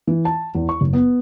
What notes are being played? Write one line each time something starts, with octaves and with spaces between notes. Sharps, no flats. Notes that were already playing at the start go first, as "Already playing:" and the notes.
E3
A5
E2
C#6
F#1
B3